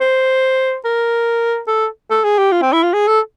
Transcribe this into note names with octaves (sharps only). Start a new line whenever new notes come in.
C5
A#4
A4
A4
G#4
G4
F4
C4
E4
F4
G#4
A4